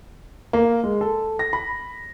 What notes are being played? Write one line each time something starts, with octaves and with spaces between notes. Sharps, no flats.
A#3
G#3
A4
A#6
B5